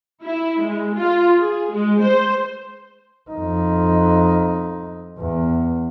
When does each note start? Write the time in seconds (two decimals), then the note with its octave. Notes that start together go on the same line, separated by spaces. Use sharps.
0.22 E4
0.61 G#3
0.96 F4
1.38 G#4
1.72 G#3
2.02 C5
3.30 F2 D#4
5.19 E2